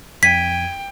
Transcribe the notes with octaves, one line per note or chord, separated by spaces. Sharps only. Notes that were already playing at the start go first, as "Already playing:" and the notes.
F2 G5 G#6 B6 D#7